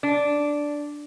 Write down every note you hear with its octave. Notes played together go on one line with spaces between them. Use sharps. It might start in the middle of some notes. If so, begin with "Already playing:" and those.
D4